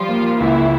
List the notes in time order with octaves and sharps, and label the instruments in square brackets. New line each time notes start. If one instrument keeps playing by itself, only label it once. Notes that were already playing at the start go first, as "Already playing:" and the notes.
Already playing: [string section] F3 F4 [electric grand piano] G3
[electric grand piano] A#3
[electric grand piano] C#2 [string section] E3 E4